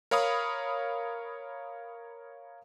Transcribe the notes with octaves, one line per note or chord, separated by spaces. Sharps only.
A#4 C#5 F5 B5 D#6